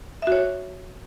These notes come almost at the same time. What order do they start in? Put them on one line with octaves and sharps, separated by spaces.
E5 F#4 C#5